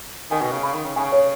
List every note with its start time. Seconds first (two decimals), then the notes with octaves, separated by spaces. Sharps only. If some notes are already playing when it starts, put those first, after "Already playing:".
0.31 D#3 G#5
0.42 B2
0.52 C#3
0.63 C#3 B5
0.74 D#3
0.85 C#3
0.96 C#3 G#5
1.12 C#5